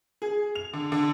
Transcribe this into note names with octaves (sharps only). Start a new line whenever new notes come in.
G#4
F7
D3
D3